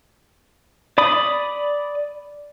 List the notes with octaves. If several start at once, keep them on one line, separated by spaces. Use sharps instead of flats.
D5 B5 D#6